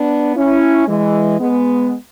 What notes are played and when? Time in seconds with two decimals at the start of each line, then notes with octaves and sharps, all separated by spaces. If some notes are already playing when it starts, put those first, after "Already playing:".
Already playing: B3 D4
0.36 C#4 E4
0.88 E3 G#3
1.40 G#3 B3